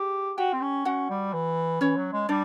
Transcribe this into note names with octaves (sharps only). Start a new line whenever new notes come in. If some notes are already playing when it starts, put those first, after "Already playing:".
Already playing: G4 G#4
F#4 G4 G5
C4
C#4
C#4 F#4 F#5
G3
E3
E3 C#4 C#5
F#3
G#3
G3 D4 D5